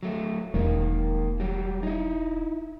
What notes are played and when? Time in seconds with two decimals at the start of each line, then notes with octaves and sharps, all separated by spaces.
0.03 F#3 A3
0.54 E1 D#3 G#3 A#3
1.40 F#3 G3
1.83 D#4 E4